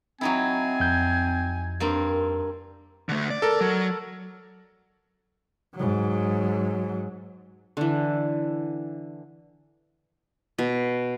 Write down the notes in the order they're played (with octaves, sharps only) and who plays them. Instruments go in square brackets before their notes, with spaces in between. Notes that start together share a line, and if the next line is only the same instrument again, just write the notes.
[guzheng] F#3 D#4 E4 [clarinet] C4 [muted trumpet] G#5
[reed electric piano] F2 G6
[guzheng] G2 A#3 C4
[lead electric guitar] D3 A3
D5
[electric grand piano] A4 A#4
[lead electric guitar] F#3
[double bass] G#2 F#3
[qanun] D3 E3
B2